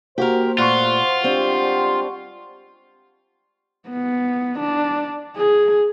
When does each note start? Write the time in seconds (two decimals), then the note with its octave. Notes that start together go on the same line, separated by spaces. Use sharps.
0.18 A#3 F#4 G4 A#4 C5
0.59 A#2 A3 F4 F#5 C6 C#6
1.24 G3 G#3 C4 D4 G4
3.89 B3
4.59 D4
5.37 G#4